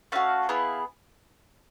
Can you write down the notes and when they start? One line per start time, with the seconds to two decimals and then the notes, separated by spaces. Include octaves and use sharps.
0.12 A3 C#4 F#4 F5
0.49 B3 E4 G#4